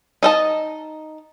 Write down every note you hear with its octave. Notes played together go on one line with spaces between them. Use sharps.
D#4 D#5 A5